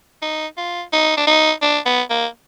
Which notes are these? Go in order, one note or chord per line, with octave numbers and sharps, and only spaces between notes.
D#4
F4
D#4
D4
D#4
D4
B3
A#3